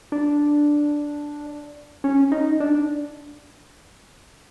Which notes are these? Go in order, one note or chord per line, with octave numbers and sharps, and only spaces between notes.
D4
C#4
D#4
D4